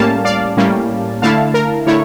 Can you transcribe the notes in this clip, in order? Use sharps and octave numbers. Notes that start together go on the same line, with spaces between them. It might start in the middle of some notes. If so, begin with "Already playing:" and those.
Already playing: A2 G3 A#3 C#4 F5 A5
D5 F5
A2 G3 A#3 C#4
D3 A3 E4 F5 A5
A#4
D3 A3 E4 C#5